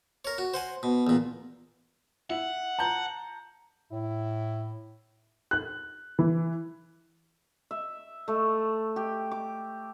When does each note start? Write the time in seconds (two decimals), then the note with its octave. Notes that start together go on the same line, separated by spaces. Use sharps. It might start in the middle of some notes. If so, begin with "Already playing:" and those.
0.25 A#4 C#5
0.38 F#4
0.54 C5 F#5 G#5
0.83 B2
1.07 E2 A#2
2.30 E4 F#5
2.79 A5 A#5 G6
3.92 A2 E4
5.51 F#6
6.19 E3
7.71 E5
8.28 A3
8.96 G4
9.31 D6